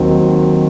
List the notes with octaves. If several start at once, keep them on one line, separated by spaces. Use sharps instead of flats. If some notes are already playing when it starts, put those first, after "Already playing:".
Already playing: D#2 D#3 F#3 C4